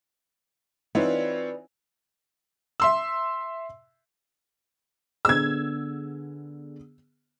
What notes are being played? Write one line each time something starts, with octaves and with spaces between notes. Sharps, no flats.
E3 C4 D#4 F4 B4 C#5 D5
E5 C6 E6
D3 B3 G#4 E6 G#6